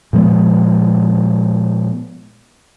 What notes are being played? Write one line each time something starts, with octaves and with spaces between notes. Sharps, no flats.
A#2 F3 G#3 B3